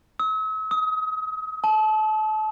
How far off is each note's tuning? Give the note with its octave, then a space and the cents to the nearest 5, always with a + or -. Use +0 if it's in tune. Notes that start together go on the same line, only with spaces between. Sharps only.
E6 -45
D#6 +30
A5 -30